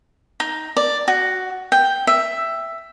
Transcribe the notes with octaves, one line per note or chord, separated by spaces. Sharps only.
D#4
D5
F#4
G5
E5